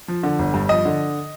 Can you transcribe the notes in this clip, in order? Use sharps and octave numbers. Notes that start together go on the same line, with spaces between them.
F3
D3
G1
G2
F3 D#5
D3